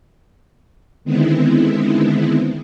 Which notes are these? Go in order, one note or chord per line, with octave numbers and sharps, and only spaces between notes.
D3 D#3 G#3 B3 C4 E4